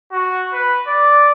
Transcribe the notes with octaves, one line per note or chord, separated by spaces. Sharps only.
F#4
B4
D5